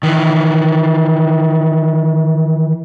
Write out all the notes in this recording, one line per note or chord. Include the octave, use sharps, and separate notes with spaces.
D#3 E3